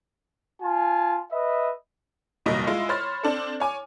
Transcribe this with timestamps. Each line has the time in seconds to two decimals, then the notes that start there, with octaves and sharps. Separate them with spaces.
0.62 F4 G#5 A5
1.32 B4 D#5 E5
2.46 F1 D#2 A#2 F#3 G3 D#5
2.67 G#3 E4 F4
2.89 C5 C#5 B5 F6 A6
3.23 C4 D4 A4
3.60 C#5 G#5 D6